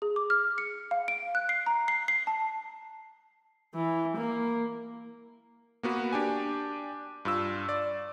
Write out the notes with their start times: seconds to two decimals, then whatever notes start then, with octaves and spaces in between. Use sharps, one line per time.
0.02 G#4
0.16 D6
0.30 F6
0.58 C#7
0.91 F5
1.08 D7
1.35 F#6
1.49 C7
1.66 A#5
1.88 C7
2.08 C7
2.27 A5
3.74 E3
4.17 A#3
5.83 A#3 B3 F#4 B4
6.12 D4 G4 G#5
7.25 G2 F4 E6
7.69 D5